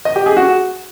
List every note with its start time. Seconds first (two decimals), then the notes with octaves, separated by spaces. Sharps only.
0.05 D#5
0.16 G4
0.26 G#4
0.37 F#4